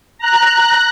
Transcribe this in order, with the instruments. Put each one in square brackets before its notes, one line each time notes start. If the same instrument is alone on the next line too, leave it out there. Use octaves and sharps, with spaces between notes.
[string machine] A#5 F#6